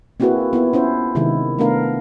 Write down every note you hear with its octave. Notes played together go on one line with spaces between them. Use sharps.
A#3 C4 E4 F#4 G#4 B4
B3 E4 F4
C#4 E4 C5
C3 D#3 G#3 E4
A3 B3 D4 A#4 F5